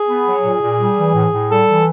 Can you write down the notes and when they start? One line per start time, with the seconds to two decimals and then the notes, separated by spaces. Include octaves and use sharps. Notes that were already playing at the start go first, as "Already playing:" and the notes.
Already playing: G#4
0.09 B3
0.27 F#3
0.45 A#2
0.62 A#2
0.80 G3
0.97 E3
1.14 A2
1.32 A2
1.50 G3 A4
1.67 E3